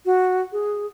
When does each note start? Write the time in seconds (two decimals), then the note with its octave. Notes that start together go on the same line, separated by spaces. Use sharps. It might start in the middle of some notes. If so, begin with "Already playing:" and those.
0.06 F#4
0.52 G#4